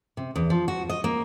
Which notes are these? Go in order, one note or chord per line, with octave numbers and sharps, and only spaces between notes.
C3
E2
F3
F#4
D#5
A#3